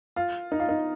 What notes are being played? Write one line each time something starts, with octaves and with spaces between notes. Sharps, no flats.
F4
D#4
F4
D#4